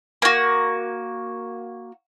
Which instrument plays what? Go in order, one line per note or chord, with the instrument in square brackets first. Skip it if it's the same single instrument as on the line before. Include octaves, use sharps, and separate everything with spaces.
[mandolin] A#3 F#4